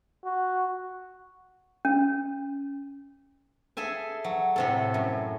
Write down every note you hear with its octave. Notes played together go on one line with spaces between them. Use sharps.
F#4
C#4
G#4 A4 E5 G#5
F#3
A2 C3 A4
F#2